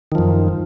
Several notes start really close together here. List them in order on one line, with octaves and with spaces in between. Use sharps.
D#3 F3 F#2